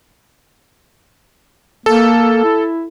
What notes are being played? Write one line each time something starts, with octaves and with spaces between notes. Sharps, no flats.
A#3 A4
E4